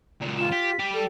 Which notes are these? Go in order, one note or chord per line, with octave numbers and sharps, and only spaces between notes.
C#2 A#2
F4 E7
G4 B6
G4 D5
A4